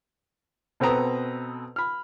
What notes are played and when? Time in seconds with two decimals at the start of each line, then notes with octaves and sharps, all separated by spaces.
0.80 B2 C4 A4 B4 A#5 D#6
1.76 B5 F6